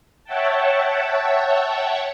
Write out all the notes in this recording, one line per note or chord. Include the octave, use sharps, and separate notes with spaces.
C#5 E5 F#5 G5 A5